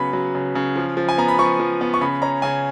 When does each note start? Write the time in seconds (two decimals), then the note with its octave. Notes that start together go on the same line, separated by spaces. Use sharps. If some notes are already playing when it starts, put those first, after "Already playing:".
Already playing: C#3 F#3 B3 B5
0.13 F#3
0.35 C#3
0.55 C#3
0.76 F3
0.97 F3
1.09 G#5
1.18 B3 A#5
1.28 B5
1.39 F3 C#6
1.60 F3
1.81 B3
1.94 C#6
2.01 C#3 B5
2.22 C#4 A#5
2.42 C#3 G#5